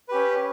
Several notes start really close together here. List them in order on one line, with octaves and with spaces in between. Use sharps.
B4 G4 C#4